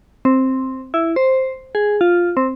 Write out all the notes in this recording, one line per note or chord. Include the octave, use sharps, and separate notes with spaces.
C4
E4
C5
G#4
F4
C4